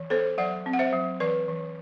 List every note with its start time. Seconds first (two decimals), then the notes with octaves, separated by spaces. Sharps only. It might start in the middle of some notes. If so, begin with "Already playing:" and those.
Already playing: E3
0.10 B3 A4 C5
0.38 F#3 D5 F#5
0.66 C4
0.73 F#5
0.79 C5 E5
0.93 F#3
1.20 E3 B4 D5
1.48 E3